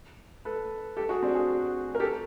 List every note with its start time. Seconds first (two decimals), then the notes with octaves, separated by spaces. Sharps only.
0.45 A4 B4
0.97 G4 A4
1.09 F#4 G#4
1.22 C4 D4
1.35 F#4 G#4
1.95 A#4
2.00 G4 A4